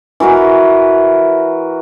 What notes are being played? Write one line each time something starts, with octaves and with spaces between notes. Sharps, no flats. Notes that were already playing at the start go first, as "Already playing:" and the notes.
E3 F#4 A#4 B4